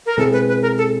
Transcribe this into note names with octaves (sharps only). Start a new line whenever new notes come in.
A#4
B2 G#3 C4 E4 G#4 A4
B4
B4
A#4
A4